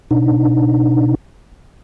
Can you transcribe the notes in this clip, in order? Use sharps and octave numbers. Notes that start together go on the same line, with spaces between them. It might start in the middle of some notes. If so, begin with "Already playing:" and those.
B2 D4 D#4